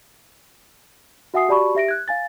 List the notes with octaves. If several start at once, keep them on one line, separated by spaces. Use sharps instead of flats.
F#4 E5 F#5 G#5 D#6 C7
F#4 G4 D5 A5 B5 C#6
G4 E5 A#6 D7
F#6 G#6
F5 G#5 A6